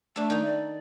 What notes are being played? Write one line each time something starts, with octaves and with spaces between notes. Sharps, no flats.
A3 D4 A4
D#3 D#4
D5